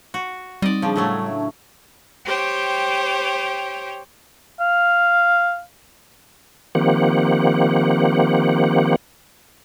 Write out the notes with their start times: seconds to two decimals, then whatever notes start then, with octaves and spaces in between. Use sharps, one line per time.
0.14 F#4
0.62 G3 C4 D#4 D5 D#5
0.82 C#3 F3 D4 G#4 A5
0.96 A2 F#3 A3 A4 E6
1.26 D4 E5
2.25 G4 C5 C#5 G5
4.60 F5
6.75 D#3 F3 A#3 C4 G4 F#5